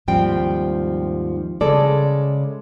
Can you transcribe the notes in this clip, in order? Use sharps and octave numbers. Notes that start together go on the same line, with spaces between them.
D#2 G#2 F3 G3 C4 G5
C#3 G#3 A4 D5